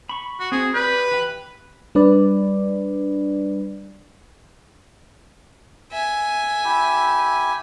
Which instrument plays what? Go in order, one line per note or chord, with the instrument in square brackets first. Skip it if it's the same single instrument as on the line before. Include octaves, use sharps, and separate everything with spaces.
[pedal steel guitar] B5 C#6
[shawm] F#4
[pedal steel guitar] C4 F#4 [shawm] G#4
[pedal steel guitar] G4 D5 G6 [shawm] B4
[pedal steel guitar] E3 G5
[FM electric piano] G3 D4 B4 D5
[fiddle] E5 G#5
[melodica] E4 G4